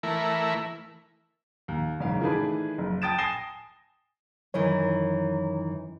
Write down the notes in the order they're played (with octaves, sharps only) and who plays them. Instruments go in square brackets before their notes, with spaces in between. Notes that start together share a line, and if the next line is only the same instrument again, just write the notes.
[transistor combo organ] E3 A3 E4 A#4
[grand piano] D#2
F#1 E2 G#2 C#3 F5
D#3 E3 A3 D4 G#4 B4
F#1
G5 A5 D#6 A6 D7 E7
G#5 D#6 A#6 C7 E7 G7
[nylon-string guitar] F#2 D#3 E3 [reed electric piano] C#5